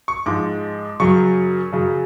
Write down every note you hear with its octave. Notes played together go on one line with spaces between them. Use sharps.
C#6
G#2 F3 G#3 D6
F#2 C#3 F#3 C#6
F#2 C#3 F#3